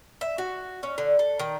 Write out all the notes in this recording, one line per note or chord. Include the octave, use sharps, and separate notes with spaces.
E5
F#4
C#4
D3
A4
D#3